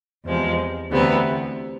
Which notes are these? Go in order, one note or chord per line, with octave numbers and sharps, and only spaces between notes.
E2 C3 F3 G#3
D2 C3 E3 B3